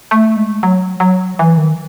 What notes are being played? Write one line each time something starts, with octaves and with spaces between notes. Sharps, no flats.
A3
G#3
F#3
F#3
E3
D#3